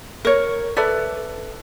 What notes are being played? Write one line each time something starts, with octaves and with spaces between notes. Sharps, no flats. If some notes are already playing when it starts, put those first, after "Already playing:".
A#4 C#5
A4 B4 D5 E5